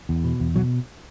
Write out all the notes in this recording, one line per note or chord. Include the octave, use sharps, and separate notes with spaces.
E2
B2
E2
B2 F#3